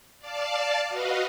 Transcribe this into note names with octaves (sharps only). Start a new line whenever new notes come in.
D5 F5 A5
F#4 B4 D#5 F5